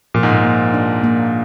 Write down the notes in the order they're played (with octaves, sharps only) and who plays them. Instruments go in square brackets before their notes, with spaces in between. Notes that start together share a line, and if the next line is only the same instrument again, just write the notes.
[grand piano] A#2 [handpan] F3
[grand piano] G#2
A#2
[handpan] A#3
D4
A#3